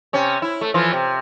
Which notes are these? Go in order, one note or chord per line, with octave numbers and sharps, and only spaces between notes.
C3 C#4
E4
A3
E3 F3 F4
C3